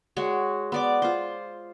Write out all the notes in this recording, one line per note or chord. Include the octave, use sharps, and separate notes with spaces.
G#3 F#4 C#5
B3 D5 D6
F4 C5